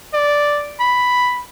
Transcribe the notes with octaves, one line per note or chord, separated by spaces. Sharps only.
D5
B5